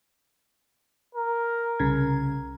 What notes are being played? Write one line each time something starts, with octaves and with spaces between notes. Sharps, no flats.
A#4
C2 C#3 G#6